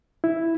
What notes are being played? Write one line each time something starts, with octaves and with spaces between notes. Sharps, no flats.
E4